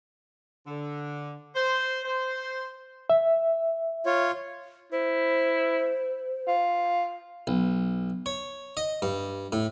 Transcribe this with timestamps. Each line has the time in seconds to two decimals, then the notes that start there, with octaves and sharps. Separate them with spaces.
0.67 D3
1.56 C5
2.05 C5
3.10 E5
4.06 F4 C#5
4.92 E4 C5
6.47 F4
7.47 B1
8.26 C#5
8.77 D#5
9.02 G2
9.52 A2